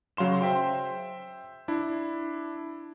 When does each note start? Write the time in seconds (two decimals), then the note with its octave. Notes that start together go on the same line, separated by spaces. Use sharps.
0.17 C#3 F#3 F5 C6 E7
0.41 C5 E5 G5 C6
1.68 D4 E4